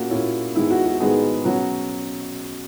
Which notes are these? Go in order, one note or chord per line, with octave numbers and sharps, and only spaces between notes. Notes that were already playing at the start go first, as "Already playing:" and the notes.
Already playing: A#2 A#3 C#4 F#4 G#4
A#2 A#3 C#4 E4
G#2 D#3 G#3 B3 E4
F#4
F#4
G#2 D#3 G#3 B3 G#4
B2 F#3 C#4 F#4